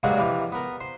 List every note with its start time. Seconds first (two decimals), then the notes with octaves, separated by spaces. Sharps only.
0.03 G2 A#2 F#3 G#3 A#3 F#4
0.18 C3 E3 F3
0.52 B3 A#4
0.81 C5